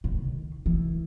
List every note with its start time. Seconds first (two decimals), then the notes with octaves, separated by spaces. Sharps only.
0.04 C#3
0.14 D#3
0.66 E3